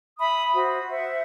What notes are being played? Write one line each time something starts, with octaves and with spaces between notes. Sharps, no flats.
E5 B5 D#6
F#4 C5
C5 E5 F#5